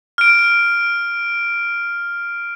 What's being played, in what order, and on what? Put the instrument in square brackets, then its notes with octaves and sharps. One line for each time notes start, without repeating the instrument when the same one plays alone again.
[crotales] F6 D7